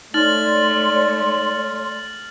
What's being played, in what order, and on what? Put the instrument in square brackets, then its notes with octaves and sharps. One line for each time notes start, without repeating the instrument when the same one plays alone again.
[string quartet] A3 [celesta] D#4 [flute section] C#5 D5 C6 [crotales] F6 A6 F#7